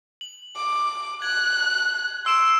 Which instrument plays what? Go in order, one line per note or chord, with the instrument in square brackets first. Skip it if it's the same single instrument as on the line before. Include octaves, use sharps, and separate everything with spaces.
[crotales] F#7
[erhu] D6
[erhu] F#6 [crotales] G#6 F#7
[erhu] C6 [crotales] E6 D7 E7